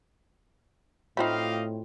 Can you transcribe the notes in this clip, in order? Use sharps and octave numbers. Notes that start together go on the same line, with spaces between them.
A2 A3 C4 D#4 F4 G4 D#5 F5